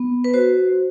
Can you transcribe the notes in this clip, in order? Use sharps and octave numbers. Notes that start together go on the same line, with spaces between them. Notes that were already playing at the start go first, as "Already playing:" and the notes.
Already playing: B3
B4
F#4 C5